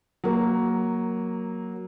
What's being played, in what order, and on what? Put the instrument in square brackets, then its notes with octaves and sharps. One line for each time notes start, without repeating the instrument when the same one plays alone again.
[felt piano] F#3 A#3